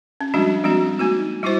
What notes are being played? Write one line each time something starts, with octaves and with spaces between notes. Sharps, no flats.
C#4
F3 G3 G#3 D4 F#4
F3 G#3 C4 F#4
A#3 D#4 F#4
G3 D#4 E4 F#4 C5